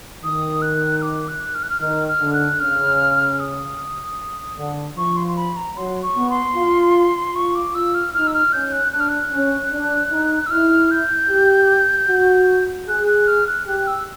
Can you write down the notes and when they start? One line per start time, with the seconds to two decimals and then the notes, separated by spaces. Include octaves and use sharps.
0.23 D#3 D#6
0.62 F#6
1.02 D6
1.28 F#6
1.54 F6
1.63 F#6
1.70 F6
1.81 D#3 F6
2.08 F6
2.21 D3
2.33 F#6
2.59 C#3 F6
3.39 D#6
4.58 D3
4.97 F3 C#6
5.16 C6
5.28 C6
5.36 B5
5.56 A#5
5.76 F#3 C6
6.02 C#6
6.16 B3
6.30 C6
6.56 F4
7.35 F4 C#6
7.55 D6
7.74 F4 E6
7.94 F6
8.14 D#4 F6
8.27 E6
8.34 F6
8.52 C#4 G6
8.72 F#6
8.92 D4 F#6
9.00 F6
9.08 F#6
9.33 C#4
9.71 D4
10.12 D#4
10.46 E6
10.50 E4 F6
10.91 G6
11.30 G4
12.09 F#4
12.88 G#4 F#6
13.07 F#6
13.27 F6
13.47 F#6
13.67 G4 F#6
13.87 E6